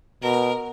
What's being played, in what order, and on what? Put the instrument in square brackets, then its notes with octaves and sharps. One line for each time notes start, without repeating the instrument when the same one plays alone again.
[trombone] B2 [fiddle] A#4